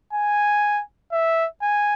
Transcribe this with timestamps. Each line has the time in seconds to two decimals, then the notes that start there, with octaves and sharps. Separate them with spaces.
0.13 G#5
1.12 E5
1.62 G#5